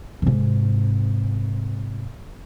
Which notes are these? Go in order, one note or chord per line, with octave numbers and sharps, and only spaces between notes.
G#2 C3